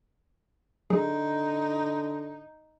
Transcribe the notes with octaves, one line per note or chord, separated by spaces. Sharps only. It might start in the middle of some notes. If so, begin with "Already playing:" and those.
D3 F#3 D#4 G#4